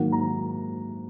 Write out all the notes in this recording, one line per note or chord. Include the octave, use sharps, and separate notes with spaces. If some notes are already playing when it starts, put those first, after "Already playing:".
Already playing: G#2 D#3 F#3 A#3 F#5
A#5